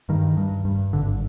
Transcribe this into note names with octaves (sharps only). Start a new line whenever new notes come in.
G2 D#3
G2
G2
G#1 D3